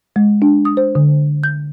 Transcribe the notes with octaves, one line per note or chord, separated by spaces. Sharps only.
G#3
D4
D#6
C5
D3
G6